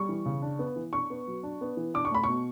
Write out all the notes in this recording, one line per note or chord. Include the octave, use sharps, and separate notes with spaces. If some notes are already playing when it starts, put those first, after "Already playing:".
Already playing: G3 C#6
E3
C#3
D4
B3
E3
D4 C#6
B3
F#3
D4
B3
E3
D4 D6
C#6
A3 B5
B2 C#6